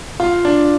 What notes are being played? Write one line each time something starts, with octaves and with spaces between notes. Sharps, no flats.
F4
D4